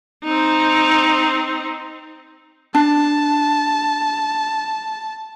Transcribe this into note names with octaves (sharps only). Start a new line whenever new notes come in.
C4 D#4
D4 A5